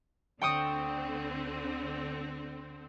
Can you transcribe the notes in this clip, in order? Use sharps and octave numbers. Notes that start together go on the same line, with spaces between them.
D2 D3 C4 G5 C#6 D#6